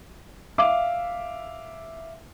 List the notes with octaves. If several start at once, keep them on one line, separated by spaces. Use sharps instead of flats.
E5 F5 D6